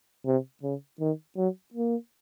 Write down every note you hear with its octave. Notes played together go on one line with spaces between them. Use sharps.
C3
C#3
D#3
F#3
A#3